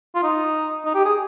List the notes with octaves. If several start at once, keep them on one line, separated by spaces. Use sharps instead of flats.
F4
D#4
D#4
G4
G#4